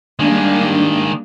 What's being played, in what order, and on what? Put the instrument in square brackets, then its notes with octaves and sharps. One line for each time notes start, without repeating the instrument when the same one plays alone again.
[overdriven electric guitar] D#3 G#3 [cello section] G3 A#3 D4